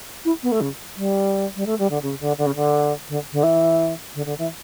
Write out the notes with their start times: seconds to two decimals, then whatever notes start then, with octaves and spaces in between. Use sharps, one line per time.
0.25 E4
0.42 B3
0.51 A3
0.61 C#3
0.96 G3
1.55 G3
1.66 A3
1.78 G3
1.90 D3
2.02 C#3
2.20 D3
2.38 D3
2.46 C#3
2.55 D3
3.08 D3
3.32 D3
3.43 E3
4.15 D3
4.25 D3
4.38 E3